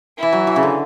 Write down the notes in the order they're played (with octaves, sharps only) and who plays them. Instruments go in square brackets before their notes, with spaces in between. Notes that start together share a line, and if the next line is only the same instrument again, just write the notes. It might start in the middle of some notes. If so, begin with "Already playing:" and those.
[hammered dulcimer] E3 [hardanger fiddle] E4
[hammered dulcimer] F#3
E3
C#3
D3